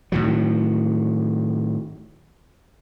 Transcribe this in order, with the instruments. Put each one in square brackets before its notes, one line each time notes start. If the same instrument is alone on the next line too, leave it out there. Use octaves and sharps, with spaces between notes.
[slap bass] A2 D#3 F#3